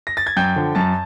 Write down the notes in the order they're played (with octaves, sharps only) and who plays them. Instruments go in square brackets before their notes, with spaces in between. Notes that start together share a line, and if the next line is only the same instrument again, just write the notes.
[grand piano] A#6
A6
G#6
F#2 G5 G6
D3 F3
F#2 A5 A6